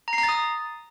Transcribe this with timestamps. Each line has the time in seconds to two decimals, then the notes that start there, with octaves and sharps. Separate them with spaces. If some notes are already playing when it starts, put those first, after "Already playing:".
0.08 A#5
0.13 C7
0.18 A#5
0.23 A6
0.29 D#6